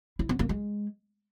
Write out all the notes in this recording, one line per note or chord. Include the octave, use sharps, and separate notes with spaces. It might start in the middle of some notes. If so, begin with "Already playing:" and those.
E4
B3
A#3
G#3